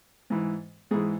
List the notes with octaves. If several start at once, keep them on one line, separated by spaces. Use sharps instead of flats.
G#2 E3
G#2 E3 G#4